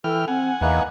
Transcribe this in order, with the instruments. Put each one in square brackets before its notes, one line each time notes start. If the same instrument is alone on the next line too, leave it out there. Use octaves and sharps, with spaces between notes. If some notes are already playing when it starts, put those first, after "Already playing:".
[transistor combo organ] E3 G5 F6 [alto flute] A4
[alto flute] C4 [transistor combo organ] F#5 G#5
[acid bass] E2 [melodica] A#3 D#4 B4 [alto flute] E5